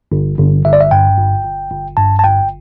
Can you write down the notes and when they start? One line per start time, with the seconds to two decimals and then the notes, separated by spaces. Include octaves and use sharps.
0.12 G1
0.38 G1
0.65 G1 E5
0.73 D5
0.80 E5
0.91 G2 G5
1.18 G1
1.45 G1
1.71 G1
1.97 G2 A5
2.19 A5
2.24 G1 G5